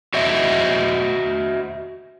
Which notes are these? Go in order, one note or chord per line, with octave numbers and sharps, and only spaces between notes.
F#4 C5 D#5 E5